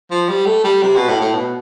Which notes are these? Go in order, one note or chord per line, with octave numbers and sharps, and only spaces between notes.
F3
G3
A3
G3
C3
B2
A2
A2
B2